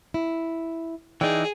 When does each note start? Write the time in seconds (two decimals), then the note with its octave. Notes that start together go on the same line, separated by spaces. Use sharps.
0.14 E4
1.21 E3 D#4 G#4 D5 G5